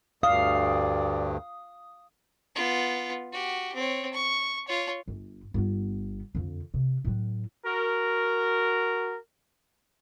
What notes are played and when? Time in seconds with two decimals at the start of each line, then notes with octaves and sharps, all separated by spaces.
0.23 D2 G2 D5 F5 D#6
2.56 B3 F4
3.32 F#4 G4
3.75 C4 C#5
4.13 C#6
4.68 F4 C#5
5.08 G1
5.54 G1 B3
6.35 F2 D3
6.74 C3
7.05 A2 F#3
7.65 F#4 A#4